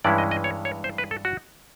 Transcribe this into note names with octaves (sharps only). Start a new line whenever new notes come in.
G2 E3 G#3 C#4 E4 D5
D#5
D#5
C#5
C#5
C5
B4
A4
F#4